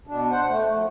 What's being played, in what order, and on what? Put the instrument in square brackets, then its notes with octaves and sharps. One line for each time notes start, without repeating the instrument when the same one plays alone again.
[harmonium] B2 D4
C5 F#5
A3
F3 A3